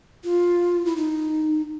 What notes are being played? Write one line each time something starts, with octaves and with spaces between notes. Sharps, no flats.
F4
E4
D#4